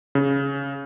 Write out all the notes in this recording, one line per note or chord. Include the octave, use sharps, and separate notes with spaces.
C#3